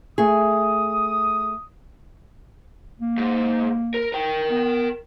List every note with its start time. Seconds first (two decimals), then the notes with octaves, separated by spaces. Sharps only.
0.18 A3 G#4 D#6
2.99 A#3
3.18 G#2
3.94 A#4
4.13 A#4 G5
4.50 B3